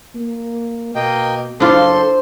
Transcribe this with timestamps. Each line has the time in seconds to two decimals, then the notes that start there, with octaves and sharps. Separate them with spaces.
0.15 A#3
0.95 B2 A#3 D#5 G5
1.60 F#1 D4 F4 A4 C5 C6